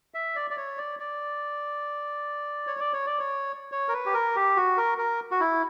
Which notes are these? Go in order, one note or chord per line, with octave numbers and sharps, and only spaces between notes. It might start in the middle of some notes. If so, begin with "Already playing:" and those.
E5
D5
D5
C#5
D5
D5
C#5
D5
C#5
D5
C#5
C#5
A#4
B4
G4
A#4
G4
F#4
A#4
A#4
F#4
E4